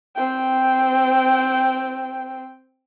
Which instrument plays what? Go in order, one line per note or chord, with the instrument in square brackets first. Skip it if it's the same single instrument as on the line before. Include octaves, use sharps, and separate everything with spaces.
[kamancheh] C4 G5